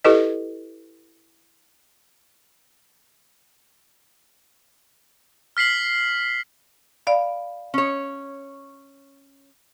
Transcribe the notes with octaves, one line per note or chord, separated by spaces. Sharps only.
E4 G4 A4 B4 D#5
F6 B6 C7 F#7
D5 F5 B5
C#4 C#5